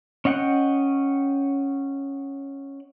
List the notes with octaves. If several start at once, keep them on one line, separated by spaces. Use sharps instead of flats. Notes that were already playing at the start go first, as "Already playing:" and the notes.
C#4 D#5 F#5 G5 F#6